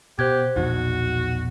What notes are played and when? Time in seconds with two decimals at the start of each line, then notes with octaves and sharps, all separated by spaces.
0.19 B2 G4 C5 F#6 G#6
0.56 A#1 E2 B2 D#4 F#4